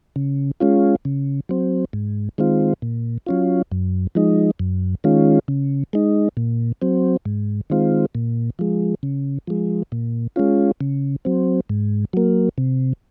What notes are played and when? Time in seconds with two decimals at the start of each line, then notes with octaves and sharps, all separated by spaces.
0.16 C#3
0.60 G#3 C#4 F4
1.05 C#3
1.49 F#3 C4
1.93 G#2
2.38 D#3 G#3 C4 F4
2.82 A#2
3.27 F#3 C#4 F4
3.72 F#2
4.15 F3 G#3 D#4
4.59 F#2
5.04 D#3 G#3 C#4 F4
5.48 C#3
5.93 G#3 D#4
6.37 A#2
6.82 F#3 C4
7.26 G#2
7.70 D#3 G#3 C4 F4
8.15 A#2
8.59 F3 G#3
9.03 C#3
9.47 F3 G#3
9.92 A#2
10.36 G#3 C#4 F4
10.81 C#3
11.25 F#3 C4
11.69 G#2
12.13 F#3 A#3
12.58 C3